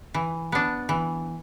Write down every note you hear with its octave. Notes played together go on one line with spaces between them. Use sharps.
E3
B3 D4
E3